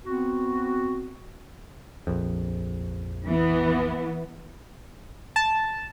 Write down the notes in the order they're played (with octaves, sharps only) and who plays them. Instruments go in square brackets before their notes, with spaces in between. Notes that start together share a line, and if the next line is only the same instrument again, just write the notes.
[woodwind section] B3 C4 F#4
[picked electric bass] A#1 F2
[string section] E3 B3
[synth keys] A5